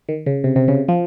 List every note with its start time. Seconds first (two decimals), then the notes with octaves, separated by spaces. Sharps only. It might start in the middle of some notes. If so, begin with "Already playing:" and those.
0.09 D#3
0.26 C#3
0.44 C3
0.56 C3
0.68 C#3
0.89 F3